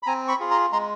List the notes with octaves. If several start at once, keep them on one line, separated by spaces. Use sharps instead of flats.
B5
C4 G#5 A#5
B5 C#6
F4 G#4
A#5 C6
G#3 A#5 C6